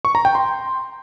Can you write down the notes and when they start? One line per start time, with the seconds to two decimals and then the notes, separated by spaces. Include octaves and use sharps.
0.05 C#6
0.15 A#5
0.25 G5
0.35 C6